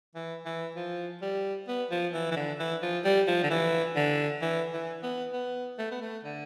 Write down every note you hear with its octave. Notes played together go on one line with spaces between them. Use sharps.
E3
E3
F3
G3
B3
F3
E3
E3
D3
E3
F3
G3
F3
D3
E3
D3
E3
E3
B3
B3
A3
B3
A3
D3